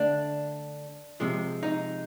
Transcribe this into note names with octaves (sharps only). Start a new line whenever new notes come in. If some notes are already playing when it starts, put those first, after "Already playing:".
Already playing: D3 A3 D4
C3 F3 G#3
D#4